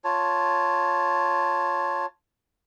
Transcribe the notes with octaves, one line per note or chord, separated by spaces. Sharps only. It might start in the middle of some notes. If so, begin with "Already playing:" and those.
F4 C#5 A5